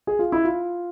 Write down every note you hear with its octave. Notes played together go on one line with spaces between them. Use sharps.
G#4
F4
E4
F4